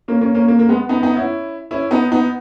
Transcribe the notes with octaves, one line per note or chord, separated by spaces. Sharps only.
A#3 C#4
A#3 C#4
A#3 C#4
A#3
A#3
G#3 B3
B3 D#4
B3 D#4
C#4 E4
C#4 E4
B3 D#4
B3 D#4